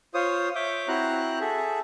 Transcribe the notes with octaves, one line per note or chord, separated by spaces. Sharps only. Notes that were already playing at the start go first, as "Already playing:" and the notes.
F4 C5 C#5 D#6
C#5 E5 D6 G6
C4 E4 F#4 C5 A#5 F#6
G#4 A4 E5